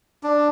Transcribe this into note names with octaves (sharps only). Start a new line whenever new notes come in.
D4